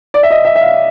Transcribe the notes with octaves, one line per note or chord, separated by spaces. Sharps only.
D5
E5
D#5
E5
E5
F5